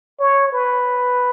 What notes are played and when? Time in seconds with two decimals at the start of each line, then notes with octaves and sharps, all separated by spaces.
0.20 C#5
0.52 B4